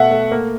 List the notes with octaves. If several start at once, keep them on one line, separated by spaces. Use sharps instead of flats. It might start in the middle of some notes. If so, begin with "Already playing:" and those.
Already playing: B2 A3 E5 F#5
A3
A#3